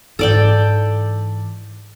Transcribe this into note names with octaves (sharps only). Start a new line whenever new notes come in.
G#2 E3 A4 D5 G5